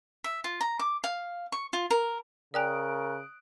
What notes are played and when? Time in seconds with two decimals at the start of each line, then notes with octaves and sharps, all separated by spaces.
0.24 E5
0.44 F4
0.61 A#5
0.79 D6
1.04 F5
1.52 C#6
1.73 F4
1.91 A#4
2.54 C#3 A#4 D5 G5 G#5 D#6 F#6 D7